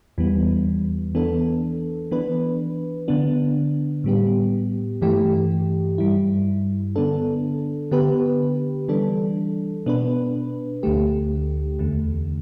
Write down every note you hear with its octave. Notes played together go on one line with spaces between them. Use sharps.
E2 E3 G3 B3
E3 B3 D4 A4
E3 B3 D4 B4
D3 B3 D4
A2 G3 B3 G4
G2 E3 A3 G4
G2 G3 E4
D3 B3 D4 A4
D3 B3 G4 B4
E3 G3 D4 A4
B2 B3 D4 B4
D2 D3 A3 G4
E2 D3 A3